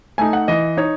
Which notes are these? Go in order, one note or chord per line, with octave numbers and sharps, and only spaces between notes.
A3 D#4 G#5
F#5
E3 D#5
D#4 C#5